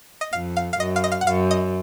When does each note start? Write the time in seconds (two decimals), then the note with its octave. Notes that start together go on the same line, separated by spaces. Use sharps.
0.21 D#5
0.33 F2 F5
0.57 F5
0.73 F5
0.80 F#2 D#5
0.96 F5
1.04 D#5
1.12 F5
1.21 F#5
1.27 F#2 F5
1.51 D#5